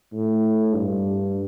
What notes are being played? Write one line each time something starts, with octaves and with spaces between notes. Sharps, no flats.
A2
G2